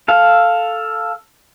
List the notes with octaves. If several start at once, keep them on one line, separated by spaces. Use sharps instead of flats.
A4 F5